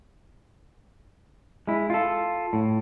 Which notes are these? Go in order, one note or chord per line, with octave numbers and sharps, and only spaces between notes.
G#3 E4
F4 A4
A2